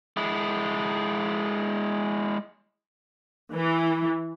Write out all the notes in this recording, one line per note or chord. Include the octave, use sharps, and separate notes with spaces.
G#3 E4
E3